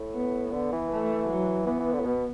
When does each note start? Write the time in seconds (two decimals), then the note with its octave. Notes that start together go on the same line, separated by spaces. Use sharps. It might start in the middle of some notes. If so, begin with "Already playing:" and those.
Already playing: A2
0.15 B3
0.53 D3 B3
0.72 E3
0.91 A3
1.29 F#3
1.66 E3 B3
1.79 E3
1.93 D3
2.00 A2
2.05 B2